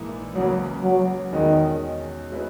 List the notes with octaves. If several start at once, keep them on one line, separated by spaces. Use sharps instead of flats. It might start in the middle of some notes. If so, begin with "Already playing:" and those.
Already playing: A#1 G#2 E3 A#3 E4
C#2 C#3 E3 F#3 A#3 C#4
F#3
E2 B2 D#3 G#3 C#4
B2 G#3 C#4 E4 B4